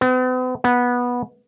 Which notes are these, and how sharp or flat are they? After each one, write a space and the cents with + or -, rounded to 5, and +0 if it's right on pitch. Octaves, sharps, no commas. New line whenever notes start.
B3 +45
B3 -15